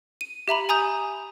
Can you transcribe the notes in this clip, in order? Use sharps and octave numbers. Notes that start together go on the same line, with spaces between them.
D#7
G4 E5 A#5 B5
G#5 A#5 D#6 G6